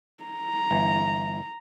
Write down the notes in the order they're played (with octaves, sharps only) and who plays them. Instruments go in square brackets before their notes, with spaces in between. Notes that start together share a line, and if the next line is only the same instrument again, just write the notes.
[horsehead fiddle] A#5
[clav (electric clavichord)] G1 E3